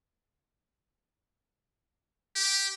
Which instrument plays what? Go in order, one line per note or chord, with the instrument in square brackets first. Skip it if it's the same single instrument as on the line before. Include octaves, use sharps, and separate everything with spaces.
[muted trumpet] G4